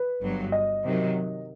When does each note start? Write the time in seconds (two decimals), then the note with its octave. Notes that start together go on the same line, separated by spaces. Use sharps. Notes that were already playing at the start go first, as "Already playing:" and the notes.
Already playing: B4
0.21 G1 G2 F#3
0.52 D#5
0.84 C3 D#3 F#3